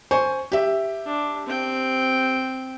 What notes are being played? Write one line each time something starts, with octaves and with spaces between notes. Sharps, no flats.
C5 G#5 C#6
G4 E5
D4
C4 G5